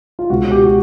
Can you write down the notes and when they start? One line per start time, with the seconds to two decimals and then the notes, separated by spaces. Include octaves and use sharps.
0.19 F4
0.30 C#2 B2 G#3 F#4
0.51 G4
0.63 F#4